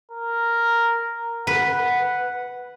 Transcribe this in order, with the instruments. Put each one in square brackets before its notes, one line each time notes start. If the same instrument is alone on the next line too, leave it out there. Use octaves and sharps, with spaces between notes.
[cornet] A#4
[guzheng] B4 [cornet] F#5